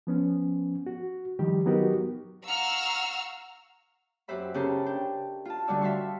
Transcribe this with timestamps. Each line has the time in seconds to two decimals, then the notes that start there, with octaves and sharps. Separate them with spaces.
0.07 F3 B3 C#4
0.86 F#4
1.39 D#3 F3 G3 G4
1.66 F#3 B3 D#4 F#4 G4 A#4
2.47 F5 F#5 A#5 C#6 E6 F6
4.28 F#2 G4 B4 C5 E5 B5
4.54 C#3 C#4 G4 A4 A#4 C6
4.86 D4 G5
5.45 F4 A5
5.67 D2 D3 G3 F#4 D5 E6
5.81 E5 F5 A5 C6 C#6